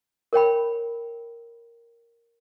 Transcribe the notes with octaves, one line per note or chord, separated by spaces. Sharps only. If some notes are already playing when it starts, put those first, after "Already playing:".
A#4 C#5 G5 B5